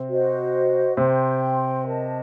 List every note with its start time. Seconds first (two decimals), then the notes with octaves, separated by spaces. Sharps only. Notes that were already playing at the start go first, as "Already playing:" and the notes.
Already playing: C3 C4
0.09 F#4 C5 D#5
0.97 C3 C4 C5 G5 C6
1.85 A#4 D#5 A5